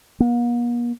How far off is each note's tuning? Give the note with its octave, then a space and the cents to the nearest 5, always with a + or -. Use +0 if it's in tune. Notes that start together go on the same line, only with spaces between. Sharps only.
A#3 +45